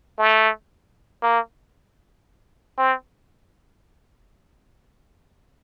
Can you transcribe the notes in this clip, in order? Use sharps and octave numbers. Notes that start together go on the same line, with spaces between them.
A3
A#3
C4